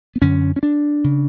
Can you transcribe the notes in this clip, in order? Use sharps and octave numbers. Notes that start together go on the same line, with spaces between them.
B3
F#2 D3 C#4
C#4
D4
C#3